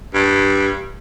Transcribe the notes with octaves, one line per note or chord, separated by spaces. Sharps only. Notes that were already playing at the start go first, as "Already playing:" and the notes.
G2